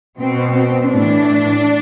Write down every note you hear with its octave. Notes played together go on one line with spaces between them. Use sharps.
B2 C4
C4
A2 E3 D4